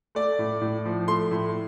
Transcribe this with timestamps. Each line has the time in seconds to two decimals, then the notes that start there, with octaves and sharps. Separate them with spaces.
0.15 A3 D5
0.39 A2
0.61 A2
0.85 F3
1.08 A3 C6
1.31 A2